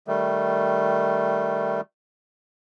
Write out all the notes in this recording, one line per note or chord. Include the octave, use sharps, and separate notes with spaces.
D#3 G3 A3